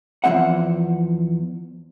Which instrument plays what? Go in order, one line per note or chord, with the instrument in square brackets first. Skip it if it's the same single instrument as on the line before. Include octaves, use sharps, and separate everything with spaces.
[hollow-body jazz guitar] E2 C#3 F3 C4 E5 F#5